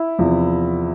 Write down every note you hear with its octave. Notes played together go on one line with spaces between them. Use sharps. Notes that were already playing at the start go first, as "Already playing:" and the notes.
Already playing: E4
E2 C3 F3